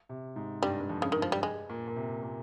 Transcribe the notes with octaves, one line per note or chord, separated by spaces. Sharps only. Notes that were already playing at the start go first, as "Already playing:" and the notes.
C3
G#2
G2 G3
G2
F2
C#3
G2 D#3
F3
G3
G#3
A#2
A#2
C3
A#2